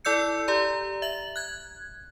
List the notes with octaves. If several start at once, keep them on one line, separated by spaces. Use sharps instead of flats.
E4 A4 D5 E6 G6 C#7
G4 D5 A#5
E5 F#7
F#6 G#6